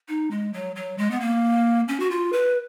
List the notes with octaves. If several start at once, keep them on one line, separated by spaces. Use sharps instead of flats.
D#4
G#3
F#3
F#3
G#3
B3
A#3
C#4
F#4
F4
B4